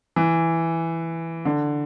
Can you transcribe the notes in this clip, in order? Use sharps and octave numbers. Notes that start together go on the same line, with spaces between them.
E3
D3